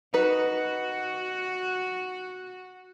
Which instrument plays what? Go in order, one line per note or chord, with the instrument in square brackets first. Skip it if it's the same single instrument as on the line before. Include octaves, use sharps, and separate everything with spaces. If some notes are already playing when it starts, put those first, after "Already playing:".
[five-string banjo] D#4 B4 [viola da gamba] F#4